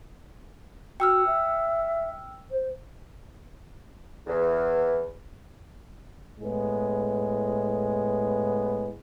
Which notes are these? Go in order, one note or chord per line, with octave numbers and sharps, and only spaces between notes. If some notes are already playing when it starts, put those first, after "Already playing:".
F#4 G5 E6 F6
E5
C5
E2
A2 G#3 B3